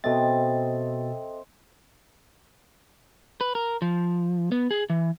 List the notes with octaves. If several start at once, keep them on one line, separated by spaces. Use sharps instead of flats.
B2 C4 A4 D#5 E5 A6
B4
A#4
F3
B3
G#4
E3